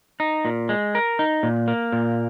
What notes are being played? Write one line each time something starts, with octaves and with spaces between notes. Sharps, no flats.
D#4
A#2
G#3
A#4
D#4
A#2
A#3
A#2